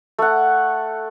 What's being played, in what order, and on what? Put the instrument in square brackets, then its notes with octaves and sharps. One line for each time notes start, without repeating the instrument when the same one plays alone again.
[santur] A3 F#5